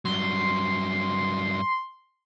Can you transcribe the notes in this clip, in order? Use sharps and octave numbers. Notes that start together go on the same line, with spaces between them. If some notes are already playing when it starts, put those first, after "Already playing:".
G2 F#3 C6